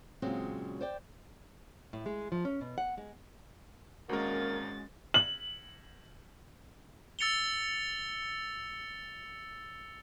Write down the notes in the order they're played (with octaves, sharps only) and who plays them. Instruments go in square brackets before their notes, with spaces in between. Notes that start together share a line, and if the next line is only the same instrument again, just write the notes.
[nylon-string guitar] A#2 C#3 F#3 G#3 C4
C5 D5 G5
A2
G#3
F3
C#4
B2
F#5
G#3
[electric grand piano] G#1 A#4 [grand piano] G#3 F#4 [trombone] A#3 [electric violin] C#4 A6
[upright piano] F#7
[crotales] E6 A6 C#7 F7 G7